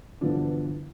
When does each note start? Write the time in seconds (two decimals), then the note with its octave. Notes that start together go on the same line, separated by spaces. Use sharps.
0.21 G2 B2 D3 E3 F3 D4